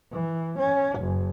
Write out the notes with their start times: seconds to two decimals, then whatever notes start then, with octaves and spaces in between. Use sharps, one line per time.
0.12 E3
0.59 C#4
1.00 F#1